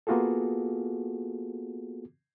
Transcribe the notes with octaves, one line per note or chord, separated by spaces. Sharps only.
A#3 B3 F4 F#4 G#4 A4